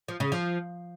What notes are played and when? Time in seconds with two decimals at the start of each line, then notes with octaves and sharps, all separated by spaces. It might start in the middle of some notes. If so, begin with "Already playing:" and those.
0.08 F3
0.20 C#3
0.32 F3